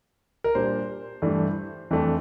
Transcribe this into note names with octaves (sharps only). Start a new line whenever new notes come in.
A#4
A#2 G3 D4 C5
G2 E3 A3 D4
F2 E3 A3 D4